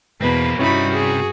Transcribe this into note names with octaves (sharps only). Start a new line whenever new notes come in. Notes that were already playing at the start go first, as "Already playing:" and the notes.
E2 B2 A#3 C4 B4
G2 C3 G3 C#4 D#4 E4 F#4 B5
G#4